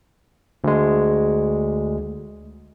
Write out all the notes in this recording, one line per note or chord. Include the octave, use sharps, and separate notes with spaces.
D2 G#3